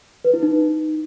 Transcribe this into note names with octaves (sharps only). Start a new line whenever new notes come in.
B4
E4
D#4